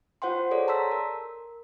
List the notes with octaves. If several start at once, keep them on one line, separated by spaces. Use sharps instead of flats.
F4 C5 F#5 G5 C6
G#4 A4 C#5 D5
A5 A#5 C6 E6 B6
A#4